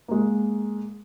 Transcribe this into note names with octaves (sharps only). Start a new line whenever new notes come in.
G#3 A#3